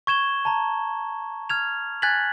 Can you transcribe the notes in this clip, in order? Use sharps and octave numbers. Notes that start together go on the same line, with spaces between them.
C#6 G#6 E7 G7
A5 A#5
F6 G#6 F7
G#5 F#6 G#6 A6 B6 F#7